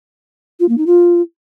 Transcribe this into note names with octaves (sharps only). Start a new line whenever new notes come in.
F4
A#3
D#4
F4